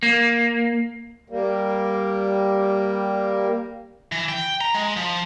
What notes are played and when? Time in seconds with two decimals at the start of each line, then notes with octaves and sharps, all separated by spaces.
0.03 A#3
1.30 G3 A#3
4.12 E3
4.29 G5
4.61 A#5
4.74 G#3
4.97 F3